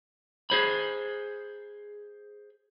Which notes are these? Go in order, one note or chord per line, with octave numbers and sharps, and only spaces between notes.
G#4 C5 B5